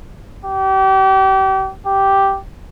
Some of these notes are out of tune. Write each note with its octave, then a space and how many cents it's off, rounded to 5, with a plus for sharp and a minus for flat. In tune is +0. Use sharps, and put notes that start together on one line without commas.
G4 -35
G4 -5